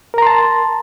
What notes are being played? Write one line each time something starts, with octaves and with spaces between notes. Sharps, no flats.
A#4 A5 A#5 C6